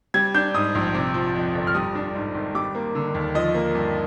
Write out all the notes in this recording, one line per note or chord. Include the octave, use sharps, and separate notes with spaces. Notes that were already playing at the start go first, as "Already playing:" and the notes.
G3 G#6
D4 G6
G#2 D#6
A#1
C3
F3
F2
G1
F6
G3 D#6
D4
G#2
G#1
G3 D6
A#3
D3
D#2
F3 D#5
A#3
G2